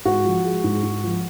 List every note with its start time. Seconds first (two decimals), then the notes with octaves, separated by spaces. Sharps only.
0.05 G#2 F#4
0.25 F3
0.45 G#3
0.64 G#2
0.83 G#2
1.04 F3